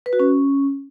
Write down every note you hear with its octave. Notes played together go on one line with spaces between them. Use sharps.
B4
F#4
C#4